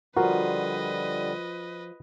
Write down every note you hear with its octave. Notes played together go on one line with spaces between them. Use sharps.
D3 F3 G3 F4 F#4 A#4 B4 D#5